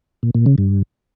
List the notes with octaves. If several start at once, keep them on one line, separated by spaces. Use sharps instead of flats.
A#2
A#2
C#3
G2